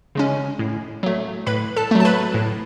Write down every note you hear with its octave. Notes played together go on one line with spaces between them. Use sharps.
C#3 G#3 C#4
A2
F#3 A3
A2 B4 B5
A4 A5
F#3 A3
A5
B4 B5
A2